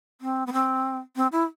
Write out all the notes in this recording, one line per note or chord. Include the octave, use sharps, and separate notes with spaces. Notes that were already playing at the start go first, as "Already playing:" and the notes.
C4
B3
C4
C4
E4